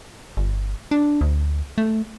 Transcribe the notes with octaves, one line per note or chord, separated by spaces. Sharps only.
G1
D4
D2
A3